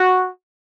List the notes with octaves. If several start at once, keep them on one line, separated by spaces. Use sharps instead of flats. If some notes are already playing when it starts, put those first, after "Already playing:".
Already playing: F#4